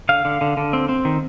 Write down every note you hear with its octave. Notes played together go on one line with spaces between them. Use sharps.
D3 F5
D3
D3
D3
C4
C4
D#3